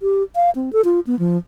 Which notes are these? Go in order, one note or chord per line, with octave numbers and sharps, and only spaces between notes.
G4
F5
C4
A4
F4
B3
F3